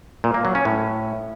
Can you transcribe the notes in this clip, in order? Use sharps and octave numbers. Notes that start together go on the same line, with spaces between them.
A#2
A#3
F#3
C#4
A2